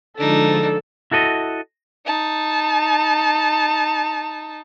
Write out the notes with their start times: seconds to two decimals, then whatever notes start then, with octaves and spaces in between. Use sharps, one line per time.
0.18 D3 F3 G#3 D4 D#4 A4
1.11 E4 F#4 A4 D5 D#5
2.06 D#4 A5